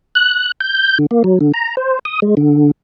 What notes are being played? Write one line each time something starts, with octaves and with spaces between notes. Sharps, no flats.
F#6
G6
D3
A#3
F#3
D3
A#5
C5
D#6
G#3
D3